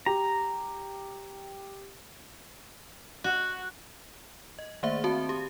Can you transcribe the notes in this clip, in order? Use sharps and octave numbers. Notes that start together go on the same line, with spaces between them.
G4 A#5
F#4
D#5
D#3 A3 A#3 C5 E5
C4 F#4 A5
G4